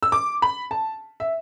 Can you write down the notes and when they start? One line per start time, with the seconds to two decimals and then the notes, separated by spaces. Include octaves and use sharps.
0.03 E6
0.12 D6
0.42 B5
0.71 A5
1.20 E5